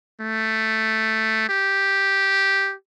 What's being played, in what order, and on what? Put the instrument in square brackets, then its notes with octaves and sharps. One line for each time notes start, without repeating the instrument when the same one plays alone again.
[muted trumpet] A3
G4